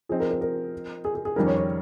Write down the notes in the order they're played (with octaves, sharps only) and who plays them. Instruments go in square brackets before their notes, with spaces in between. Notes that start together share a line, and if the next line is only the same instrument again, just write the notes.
[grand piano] F3 C4 D#4 [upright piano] G#4
[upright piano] A#4
A#4
A#4
G#4
G#4
G#4
[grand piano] F2 D#3 G3 C#4 [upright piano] A#4
[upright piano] C#5
C#5